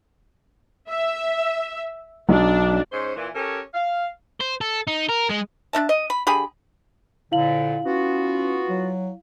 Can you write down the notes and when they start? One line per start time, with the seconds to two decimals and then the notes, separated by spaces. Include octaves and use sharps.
0.88 E5
2.29 B1 D4
2.92 G#2 C#4 C5
3.16 A#2 E3
3.35 C#4 G4 A4 A#4 C#5
3.74 F5
4.41 C5
4.61 A4
4.87 D#4
5.09 A#4
5.31 G#3
5.73 D4 D#4 E5 A5
5.89 D#5
6.10 B5
6.27 D3 G4 G#4 B5
7.32 F2 A#2 D3 E4 F5 F#7
7.85 B3 C#4 F4 F#4
8.69 F#3